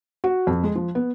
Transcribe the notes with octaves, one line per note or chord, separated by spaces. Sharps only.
F#4
F2
G#3
F3
B3